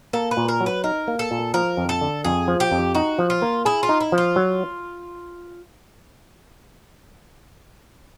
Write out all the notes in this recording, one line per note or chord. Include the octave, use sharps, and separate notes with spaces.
A#3 A4
B4
A#2
A#4
F#3
B4
D#4 A#4
A#3
A4
A#2
F3 A#4
F2
A4
D3
F2 G#4
F3
G4
F2
D#4 F#4
F3
F4
A#3
E4 G#4
F4
D#4
E4
F3
F4
F#3